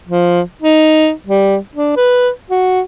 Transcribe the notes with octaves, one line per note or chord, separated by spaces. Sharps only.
F3
D#4
G3
D4
B4
F#4